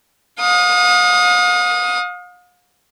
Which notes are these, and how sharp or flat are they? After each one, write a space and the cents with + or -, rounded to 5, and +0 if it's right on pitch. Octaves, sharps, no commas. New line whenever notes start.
F5 +45 D#6 +0